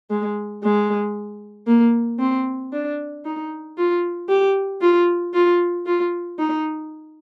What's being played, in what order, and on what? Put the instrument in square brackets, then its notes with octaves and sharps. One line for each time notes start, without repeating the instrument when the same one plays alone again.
[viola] G#3
G#3
A#3
C4
D4
D#4
F4
G4
F4
F4
F4
D#4